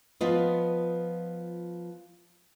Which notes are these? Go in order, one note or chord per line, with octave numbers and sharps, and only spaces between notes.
F3 B3 F4 B4 D#5